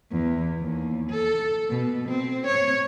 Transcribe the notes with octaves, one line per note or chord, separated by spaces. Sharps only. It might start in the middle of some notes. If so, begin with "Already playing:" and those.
E2
D#2
A4
B2
C4
C#5